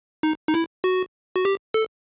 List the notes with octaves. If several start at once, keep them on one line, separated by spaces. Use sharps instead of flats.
D#4
D#4
E4
F#4
F#4
G4
A4